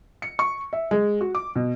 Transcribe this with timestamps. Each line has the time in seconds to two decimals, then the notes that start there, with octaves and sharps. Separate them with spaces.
0.22 C#7
0.39 C#6
0.73 E5
0.91 G#3
1.21 F#4
1.35 D6
1.56 B2